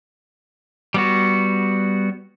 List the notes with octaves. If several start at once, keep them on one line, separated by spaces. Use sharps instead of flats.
G3 B3 F#4